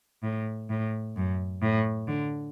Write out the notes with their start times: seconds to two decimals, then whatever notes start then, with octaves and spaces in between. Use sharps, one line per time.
0.23 A2
0.70 A2
1.16 F#2
1.62 A2
2.08 D3